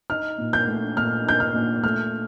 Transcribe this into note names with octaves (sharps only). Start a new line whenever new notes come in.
D#4 F6
A#2
G6
A3
A#2 F6
D#4 G6
F6
A#2
A3 F6